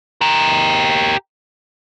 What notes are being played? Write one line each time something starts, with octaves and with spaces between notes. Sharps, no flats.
G4 A#4